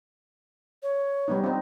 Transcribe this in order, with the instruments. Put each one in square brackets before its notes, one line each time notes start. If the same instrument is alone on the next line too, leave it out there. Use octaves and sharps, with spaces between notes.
[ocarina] C#5
[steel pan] G3 B3 D#4
C4 D#4